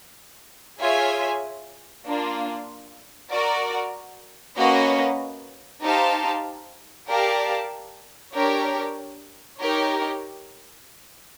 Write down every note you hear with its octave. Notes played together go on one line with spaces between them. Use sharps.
F4 G#4 C#5 E5 G#5
A#3 D4 F4
F#4 A#4 D5
A#3 C#4 F#4 B4 D#5
D#4 G4 C5 F5 A5
G4 A#4 D5 F5 A5
D4 G4 A#4 C#5
D#4 G4 A#4 C#5